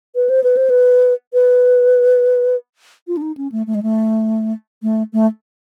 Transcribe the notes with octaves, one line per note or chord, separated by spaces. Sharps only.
B4
C5
B4
C5
B4
B4
F4
D4
D#4
C#4
A3
A3
G#3
A3
A3
A3